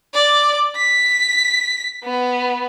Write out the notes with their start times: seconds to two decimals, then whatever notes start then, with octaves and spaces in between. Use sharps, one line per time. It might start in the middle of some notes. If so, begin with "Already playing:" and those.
0.14 D5
0.76 B6
2.04 B3